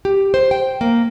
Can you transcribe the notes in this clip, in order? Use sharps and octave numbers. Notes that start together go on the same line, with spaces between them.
G4
C5
G5
A#3